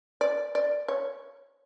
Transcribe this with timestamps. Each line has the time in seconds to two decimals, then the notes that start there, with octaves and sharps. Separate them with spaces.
0.21 D5
0.55 D5
0.88 C#5